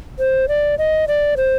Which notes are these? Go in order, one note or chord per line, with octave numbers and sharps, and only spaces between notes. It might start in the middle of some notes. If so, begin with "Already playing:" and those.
C5
D5
D#5
D5
C5